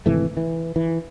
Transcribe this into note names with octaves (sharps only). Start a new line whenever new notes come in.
G#1 C3 E3 A3
E3
E3